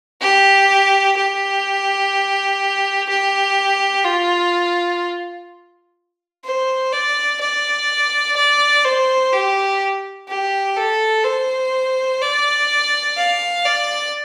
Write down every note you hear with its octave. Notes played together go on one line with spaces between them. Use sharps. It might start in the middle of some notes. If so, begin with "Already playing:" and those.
G4
G4
G4
F4
C5
D5
D5
D5
C5
G4
G4
A4
C5
D5
F5
D5